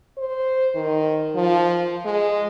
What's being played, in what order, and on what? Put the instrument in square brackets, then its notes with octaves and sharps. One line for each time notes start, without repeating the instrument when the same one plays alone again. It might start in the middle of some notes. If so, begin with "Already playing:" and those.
[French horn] C5
D#3
F3
G#3